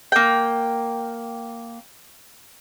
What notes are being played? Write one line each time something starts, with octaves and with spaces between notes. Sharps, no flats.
A#3 G5